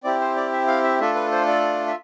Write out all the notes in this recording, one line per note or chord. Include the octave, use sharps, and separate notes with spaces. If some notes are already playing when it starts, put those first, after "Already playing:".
C4 E4 G4 D5
C5
D5
E5
F5
E5
A3 D4 F4 A4 E5
B4
C5
D5
E5